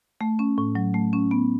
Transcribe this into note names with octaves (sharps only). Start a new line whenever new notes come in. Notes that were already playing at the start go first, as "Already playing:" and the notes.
A3
C#4
A2
F#3
A3
C#4
B3